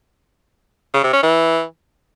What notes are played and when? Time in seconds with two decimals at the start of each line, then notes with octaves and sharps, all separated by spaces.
0.94 C#3
1.03 C3
1.13 C#4
1.23 E3